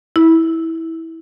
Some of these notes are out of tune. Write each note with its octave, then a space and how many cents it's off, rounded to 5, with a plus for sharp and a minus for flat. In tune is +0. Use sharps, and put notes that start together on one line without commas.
E4 -15